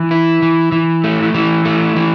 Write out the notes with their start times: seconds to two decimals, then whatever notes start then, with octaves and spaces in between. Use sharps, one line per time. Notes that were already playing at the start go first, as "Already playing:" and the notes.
Already playing: E3
0.11 E4
0.42 E3
0.72 E3
1.04 A3
1.34 E3
1.65 A3
1.96 E3